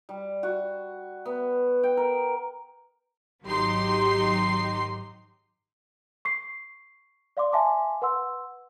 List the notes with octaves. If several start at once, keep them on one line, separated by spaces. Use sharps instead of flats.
G3
F#4
B3
G5
A#4
G#1 F#3 D#4 G4 C6 C7
C#6 C7
D5 F5 C6 D6
E5 F5 G#5 A5 C6 D6
B4 F#5 C6 E6